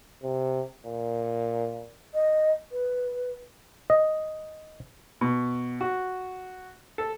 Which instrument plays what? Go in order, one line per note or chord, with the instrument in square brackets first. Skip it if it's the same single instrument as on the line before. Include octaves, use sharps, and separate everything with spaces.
[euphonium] C3
A#2
[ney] D#5
B4
[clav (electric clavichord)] D#5
[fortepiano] B2
F#4
A4